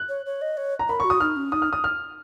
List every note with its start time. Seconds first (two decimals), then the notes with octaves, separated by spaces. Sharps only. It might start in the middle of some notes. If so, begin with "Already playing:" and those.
Already playing: F#6
0.09 C#5
0.26 C#5
0.41 D#5
0.57 C#5
0.79 A#5
0.89 A#4 B5
1.00 F#4 C#6
1.10 D#6
1.20 D#4 F6
1.36 C#4
1.52 D#4 D#6
1.62 F6
1.73 D#6
1.84 F6